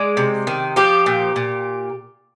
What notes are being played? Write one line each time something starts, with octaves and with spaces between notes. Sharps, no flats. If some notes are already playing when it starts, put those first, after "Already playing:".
Already playing: G#3 D5
C3
D#3
F3 G4
A#2
A#2